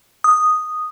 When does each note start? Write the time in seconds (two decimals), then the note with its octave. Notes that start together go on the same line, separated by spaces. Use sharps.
0.24 D#6